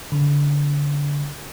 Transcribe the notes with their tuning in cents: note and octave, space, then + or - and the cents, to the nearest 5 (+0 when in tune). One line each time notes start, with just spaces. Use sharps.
D3 -25